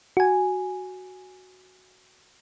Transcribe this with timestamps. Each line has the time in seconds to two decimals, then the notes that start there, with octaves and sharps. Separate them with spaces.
0.17 F#4 G#5